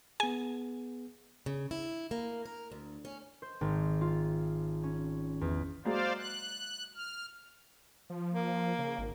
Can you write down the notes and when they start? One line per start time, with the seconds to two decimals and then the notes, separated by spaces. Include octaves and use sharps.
0.20 B3 G#4 G#5
1.46 C#3
1.71 E4
2.11 A#3
2.45 A#4
2.72 D2
3.05 C#4
3.42 C5
3.61 G#1
4.01 F4
4.83 C#4
5.41 E2
5.85 F#3 G#3 A#3 C5 D5 F5
6.18 F#6
6.95 F6
8.10 F3
8.33 A#3
8.79 C#3
8.99 G#1